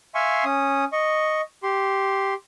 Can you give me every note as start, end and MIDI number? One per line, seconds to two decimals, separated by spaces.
0.15 0.44 76
0.15 0.44 77
0.15 0.44 80
0.15 0.44 84
0.15 0.44 85
0.45 0.85 61
0.45 0.85 87
0.93 1.41 75
0.93 1.41 85
1.63 2.34 67
1.63 2.34 84